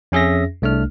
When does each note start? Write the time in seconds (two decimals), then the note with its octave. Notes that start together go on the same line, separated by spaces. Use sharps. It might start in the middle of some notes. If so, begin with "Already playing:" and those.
0.12 F2 C#4 G#4 E5 A#6
0.62 C2 A3 D4 F6